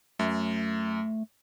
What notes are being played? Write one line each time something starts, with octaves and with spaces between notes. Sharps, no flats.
F#2 A3